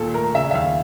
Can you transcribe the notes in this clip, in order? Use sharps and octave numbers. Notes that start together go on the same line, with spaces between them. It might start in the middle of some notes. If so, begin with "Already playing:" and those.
Already playing: D#2 A#2 A4
A3 A#4
C#3 E5
E5
D#2 F5